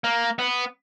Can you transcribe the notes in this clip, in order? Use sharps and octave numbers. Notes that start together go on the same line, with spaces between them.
A#3
B3